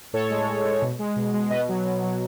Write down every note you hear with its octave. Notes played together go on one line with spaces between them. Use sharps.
A2 A4 C#5
G#3
A2
G#3
B2
G#3
B2
G#3
B2 B4 D#5
F#3
B2
F#3